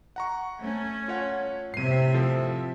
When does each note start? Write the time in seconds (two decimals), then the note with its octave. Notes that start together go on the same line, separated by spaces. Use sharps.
0.16 F#5 A#5 C#6
0.59 A3 C#4
1.08 F4 C#5 F#5
1.74 A2 C3 E5 C7 D#7
2.14 F3 C4 A4